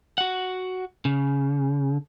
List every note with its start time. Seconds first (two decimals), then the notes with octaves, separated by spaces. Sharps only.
0.18 F#4 F#5
1.05 C#3